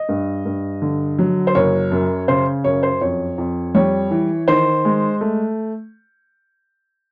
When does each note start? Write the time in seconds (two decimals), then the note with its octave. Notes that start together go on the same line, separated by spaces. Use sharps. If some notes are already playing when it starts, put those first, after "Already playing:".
Already playing: D#5
0.09 G2
0.45 G2
0.82 D3
1.19 F#3
1.47 C5
1.55 F#1 C#5
1.92 F#2
2.28 C#3 C5
2.64 F#2 C#5
2.83 C5
3.01 F2 C#5
3.38 F2
3.75 G3 C#5
4.11 E3
4.48 D#3 C5
4.85 G#3
5.21 A3